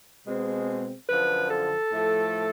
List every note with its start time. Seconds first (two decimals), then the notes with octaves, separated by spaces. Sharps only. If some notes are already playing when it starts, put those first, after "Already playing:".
0.26 B2 G#3 C4
1.09 F#2 D3 F3 B4
1.50 A4
1.92 A2 F3 A3